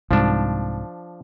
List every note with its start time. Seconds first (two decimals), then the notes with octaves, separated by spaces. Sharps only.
0.11 C2 G#2 F3 D4